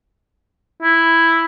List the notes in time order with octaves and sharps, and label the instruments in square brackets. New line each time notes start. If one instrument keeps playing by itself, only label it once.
[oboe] E4